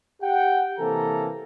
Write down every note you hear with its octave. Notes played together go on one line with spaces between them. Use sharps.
G4 F#5 G5
C3 E3 A#3 A4 G#5 A#5